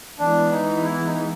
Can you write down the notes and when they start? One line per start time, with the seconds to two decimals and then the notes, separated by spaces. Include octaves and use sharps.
0.19 E3 G#3 B3 D4
0.52 D#4
0.84 E4
1.06 D#4